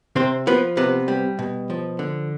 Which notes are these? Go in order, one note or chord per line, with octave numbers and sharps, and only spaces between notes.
C3 C4 C5
F3 B3 B4
C3 B3 B4
G3
B2
F3
D3